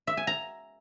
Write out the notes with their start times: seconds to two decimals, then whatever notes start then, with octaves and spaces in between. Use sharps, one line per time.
0.07 E5
0.17 G#5
0.27 A#5